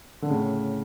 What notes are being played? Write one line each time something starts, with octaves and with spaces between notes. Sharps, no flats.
D3
A2 C#3